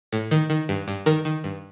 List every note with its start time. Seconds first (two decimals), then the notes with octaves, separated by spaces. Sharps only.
0.12 A2
0.31 D#3
0.50 D#3
0.69 G2
0.88 G2
1.06 D#3 A#4
1.25 D#3
1.44 G2